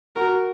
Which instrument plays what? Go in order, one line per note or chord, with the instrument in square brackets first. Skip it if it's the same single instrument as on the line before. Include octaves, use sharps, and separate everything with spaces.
[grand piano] F#4 [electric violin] A#4